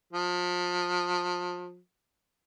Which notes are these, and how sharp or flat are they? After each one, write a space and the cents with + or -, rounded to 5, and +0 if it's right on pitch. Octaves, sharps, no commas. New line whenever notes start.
F3 +30